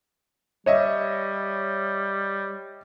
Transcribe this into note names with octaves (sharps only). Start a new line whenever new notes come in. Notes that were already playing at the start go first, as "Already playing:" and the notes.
G3 C#5 D#5 E5